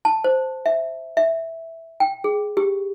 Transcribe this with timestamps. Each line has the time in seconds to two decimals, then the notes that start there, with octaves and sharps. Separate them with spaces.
0.05 A5
0.24 C5
0.66 E5
1.17 E5
2.00 G5
2.24 G#4
2.57 G4